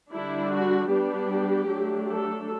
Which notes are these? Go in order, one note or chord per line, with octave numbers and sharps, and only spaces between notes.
D3 G3 D4 E4
F#4
G3 B3 D4 G4
F#3 A3 D4
A4